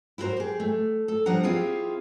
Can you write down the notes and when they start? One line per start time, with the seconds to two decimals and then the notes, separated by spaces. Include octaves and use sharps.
0.18 E4 F#4 A4 A#4 C5
0.36 G4 G#4
0.60 A3
1.08 A4
1.26 F3 G3 D4 F#5 A#5
1.43 C4 E4 F4 G4 G#4 F5